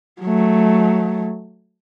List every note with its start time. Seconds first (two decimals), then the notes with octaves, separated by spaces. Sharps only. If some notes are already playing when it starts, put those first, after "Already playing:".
0.21 F#3 A3